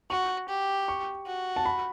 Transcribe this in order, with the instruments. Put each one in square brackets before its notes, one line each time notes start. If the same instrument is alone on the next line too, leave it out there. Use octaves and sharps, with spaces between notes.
[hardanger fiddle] F#4 [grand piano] C#6
[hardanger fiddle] G4
[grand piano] C#6
[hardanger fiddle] F#4
[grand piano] A5
B5